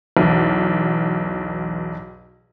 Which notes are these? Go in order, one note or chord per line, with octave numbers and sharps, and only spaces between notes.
B1 E2